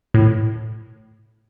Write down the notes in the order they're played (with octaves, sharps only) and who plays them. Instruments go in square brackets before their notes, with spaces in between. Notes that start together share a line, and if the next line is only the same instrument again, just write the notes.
[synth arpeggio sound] A2